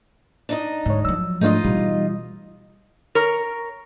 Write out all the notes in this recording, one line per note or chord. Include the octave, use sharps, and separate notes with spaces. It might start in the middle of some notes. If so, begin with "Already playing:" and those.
D4 D#4 D#5
D2 G#2 C#5
F3 F#3 E6
G#2 A3 D4 D#4 F4 D#5
B2 E3 G3
A#4 C#5